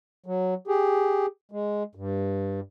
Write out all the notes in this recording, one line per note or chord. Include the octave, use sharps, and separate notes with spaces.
F#3
G4 G#4
G#3
G2